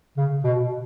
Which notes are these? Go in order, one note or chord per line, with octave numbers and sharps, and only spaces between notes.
C#3
B2